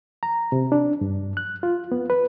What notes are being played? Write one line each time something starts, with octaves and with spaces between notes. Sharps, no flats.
A#5
C3
D4
G2
F#6
F4
B3
B4